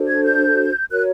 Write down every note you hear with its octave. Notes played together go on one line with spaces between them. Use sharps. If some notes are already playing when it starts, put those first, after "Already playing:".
Already playing: D4 F#4 A4 C5
G#6
G6
F#4 A#4 C#5 F#6